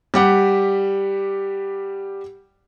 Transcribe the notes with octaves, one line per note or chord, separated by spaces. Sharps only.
G3 G4 F#5